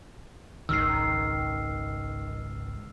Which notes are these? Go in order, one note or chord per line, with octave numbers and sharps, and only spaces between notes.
G#1 C#2 D#3 E6 F6 C7